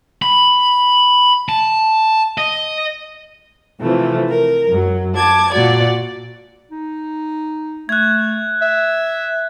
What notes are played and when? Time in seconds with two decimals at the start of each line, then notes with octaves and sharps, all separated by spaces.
0.22 B5
1.49 A5
2.38 D#5
3.80 C3 E3 F3 A3
4.29 A#4
4.70 F#2 F#3
5.15 A5 D6 G#6
5.52 A#2 F#4 D5
6.71 D#4
7.89 A3 F#6 G#6
8.62 E5